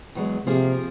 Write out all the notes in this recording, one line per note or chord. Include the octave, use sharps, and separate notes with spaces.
E2 F#3 G#3
C3 F3 A#3 G#4